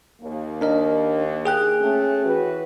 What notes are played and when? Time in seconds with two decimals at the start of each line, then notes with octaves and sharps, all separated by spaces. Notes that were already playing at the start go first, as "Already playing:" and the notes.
0.22 D#2 A#3
0.61 D4 A#4 D#5
1.45 G#4 G5 F#6
1.80 A3 C#4
2.24 E3 F#4 B4